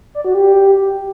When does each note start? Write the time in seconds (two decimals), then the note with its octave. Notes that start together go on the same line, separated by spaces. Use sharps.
0.15 D5
0.25 F#4
0.34 G4